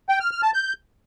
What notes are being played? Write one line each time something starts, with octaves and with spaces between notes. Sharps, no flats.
G5
F6
F6
A5
G6